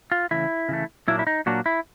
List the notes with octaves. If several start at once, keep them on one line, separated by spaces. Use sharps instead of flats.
F4
C#3 E3 A3 E4
C#3 E3 A3
A#2 F#3 A#3 D4 E4
E4
D#4
A#2 F#3 A#3 D4 F#4
E4